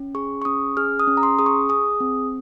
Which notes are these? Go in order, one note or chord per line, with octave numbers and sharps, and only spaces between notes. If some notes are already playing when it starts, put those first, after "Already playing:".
Already playing: C#4
G#4 C#6
C#6
C#4 D#6
G#4 F6
D#6
C#4
A#5
C6
G#4 D#6
C#6
G#4 D#6
C4